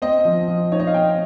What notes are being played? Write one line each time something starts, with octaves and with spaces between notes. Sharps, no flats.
C4 D#5
F3
F3
D#4 C#5
D#5
F5
C4 G5